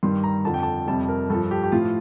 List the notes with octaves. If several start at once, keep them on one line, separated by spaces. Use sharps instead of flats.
G2 D#3 G3 C6
A#5
F2 D3 F3 A5
G5
A5
F2 C3 G3 A5
A#4
G2 F3 A4
G4
G4
A2 F3 F4